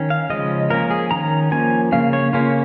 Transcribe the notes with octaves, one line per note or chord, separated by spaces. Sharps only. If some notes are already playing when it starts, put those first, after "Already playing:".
Already playing: D#3 C#4
F5
C#3 F3 G#3 C#4 D#5
F3 A#3 C#4 A#4
G#4
D#3 C#4 A#5
F3 A#3 C#4 G#5
C#3 A#3 C#4 F5
C#5
C#3 A#3 C#4 F4